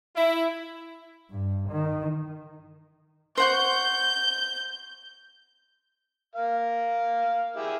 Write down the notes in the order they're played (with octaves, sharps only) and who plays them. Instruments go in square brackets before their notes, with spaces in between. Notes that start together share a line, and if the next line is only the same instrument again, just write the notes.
[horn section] E4
[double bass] G2
D#3
[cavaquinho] C5 F#5 C#6 [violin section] G6
[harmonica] A#4 F5
E4 G4 G#4